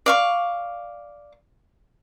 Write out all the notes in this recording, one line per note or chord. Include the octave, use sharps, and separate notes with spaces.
D5 F5 C#6